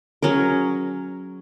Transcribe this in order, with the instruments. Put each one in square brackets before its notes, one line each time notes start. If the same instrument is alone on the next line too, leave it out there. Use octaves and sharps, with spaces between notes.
[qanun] F#3 C#4 G#4 A#4